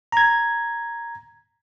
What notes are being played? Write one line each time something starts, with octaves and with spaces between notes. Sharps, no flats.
A#5 G#6